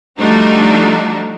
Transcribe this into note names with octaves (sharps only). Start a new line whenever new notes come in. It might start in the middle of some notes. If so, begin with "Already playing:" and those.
F3 G3 A3 D4 D#4 F#4